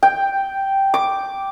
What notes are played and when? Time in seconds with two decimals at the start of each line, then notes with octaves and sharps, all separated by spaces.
0.03 G5
0.94 D6